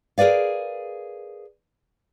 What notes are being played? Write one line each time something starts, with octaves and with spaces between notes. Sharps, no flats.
G#4 A#4 B4 D5 F5